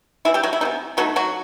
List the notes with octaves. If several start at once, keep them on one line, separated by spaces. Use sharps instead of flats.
C3 E3 B3 E4
G3 G4
F#3 F#4
E4
C3 E3 B3 D#4
B2 F#3 A3 D#4 F#4
F#3 F#4